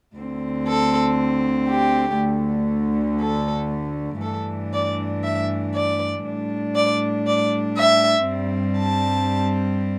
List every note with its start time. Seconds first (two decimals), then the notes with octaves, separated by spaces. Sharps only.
0.16 D2 D3 C4
0.67 A4
1.69 G4
2.19 D2 D3 A3
3.20 A4
4.22 G2 E3 A3 D4 A4
4.73 D5
5.24 E5
5.74 D5
6.24 A2 G3 D4
6.75 D5
7.27 D5
7.77 E5
8.28 G2 G3 C4
8.78 A5